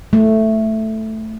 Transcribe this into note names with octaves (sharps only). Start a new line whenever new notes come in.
A3